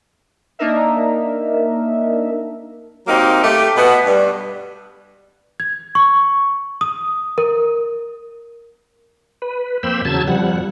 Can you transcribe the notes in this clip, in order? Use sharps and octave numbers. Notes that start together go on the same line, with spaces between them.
A#3 D4 D#4 A#4 E5
F#3 A#3 C4 D#4 G4
A3 G4
B2 B3
G2
G#6
C#6
D#6
A#4
B4
F2 A#3 C5 G5 B5 E6
E2 C#3 F#3 A5 E6 G#6
F2 F3 G3 F#5